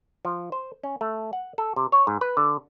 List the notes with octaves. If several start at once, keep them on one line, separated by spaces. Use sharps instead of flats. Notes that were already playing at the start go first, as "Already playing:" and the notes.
F3
C5
C#4
A3
F#5
A4
C3
C#5
G#2
B4
D3